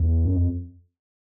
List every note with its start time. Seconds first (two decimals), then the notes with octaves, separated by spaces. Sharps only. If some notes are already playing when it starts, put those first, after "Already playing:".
Already playing: E2
0.25 F#2
0.36 F2